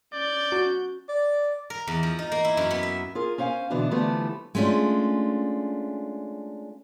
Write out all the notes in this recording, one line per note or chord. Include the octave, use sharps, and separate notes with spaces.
C#4 D5 G6
F#4
D5
A#4
E2
F3
D#4
A#3
E4
F#2
B3
E5
F4 G#4 A#4
C#4 C5 F5 G5 G#5
B2 D3 E3 B3 D4 F#4
D3 E3 F3 G3 A3 B3
G#3 A3 C#4 D4 F4